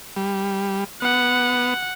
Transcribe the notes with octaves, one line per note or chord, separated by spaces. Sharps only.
G3
B3 F#5